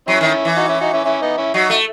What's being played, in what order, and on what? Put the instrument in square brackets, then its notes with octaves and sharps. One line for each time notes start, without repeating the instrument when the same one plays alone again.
[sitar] F#3 [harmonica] C#4 E4
[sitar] D#3
E3
[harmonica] D#4 F#4
C#4 E4
D#4 F#4
C#4 E4
C#4 E4
B3 D#4
C#4 E4
[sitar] F#3 [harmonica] D#4 F#4
[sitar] A3